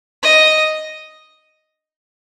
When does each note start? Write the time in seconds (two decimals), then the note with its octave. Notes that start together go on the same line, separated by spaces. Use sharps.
0.23 D#5